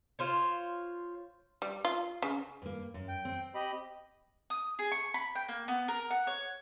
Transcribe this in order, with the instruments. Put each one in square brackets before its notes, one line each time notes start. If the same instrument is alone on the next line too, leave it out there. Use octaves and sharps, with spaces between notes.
[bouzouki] F4 C5 C#5
[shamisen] G3
F4
C#3
[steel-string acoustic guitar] G2 A#3
F#2
[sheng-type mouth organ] G5
[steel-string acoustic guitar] C4
[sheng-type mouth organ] G4 D#5 B5
[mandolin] D#6
G#4
C#6
B5
G5
A#3
B3
A#4
F#5
C#5